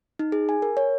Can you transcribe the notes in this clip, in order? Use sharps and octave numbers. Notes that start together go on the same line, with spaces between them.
D#4
G#4
G#5
A#4
C#5